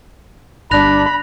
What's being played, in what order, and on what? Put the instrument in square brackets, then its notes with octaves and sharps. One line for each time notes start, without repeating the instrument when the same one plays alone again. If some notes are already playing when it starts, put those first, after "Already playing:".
[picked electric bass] G1 G2 [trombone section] D4 [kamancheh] B5 [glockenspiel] F#6 A#6 F7